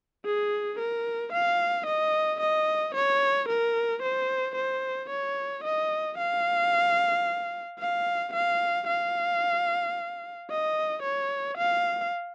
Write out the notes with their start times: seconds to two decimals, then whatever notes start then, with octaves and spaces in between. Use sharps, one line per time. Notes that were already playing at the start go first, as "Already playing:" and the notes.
0.26 G#4
0.79 A#4
1.33 F5
1.87 D#5
2.41 D#5
2.95 C#5
3.49 A#4
4.02 C5
4.56 C5
5.10 C#5
5.64 D#5
6.18 F5
7.79 F5
8.34 F5
8.87 F5
10.50 D#5
11.03 C#5
11.58 F5